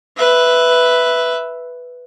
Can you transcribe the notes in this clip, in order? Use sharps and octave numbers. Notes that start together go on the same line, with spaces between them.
B4 E5